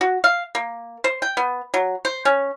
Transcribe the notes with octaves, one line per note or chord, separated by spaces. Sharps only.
F#4
F5
A#3
C5
G5
B3
F#3
C5
C#4